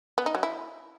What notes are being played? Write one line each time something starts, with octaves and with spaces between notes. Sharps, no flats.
B3
D#4
F#3
E4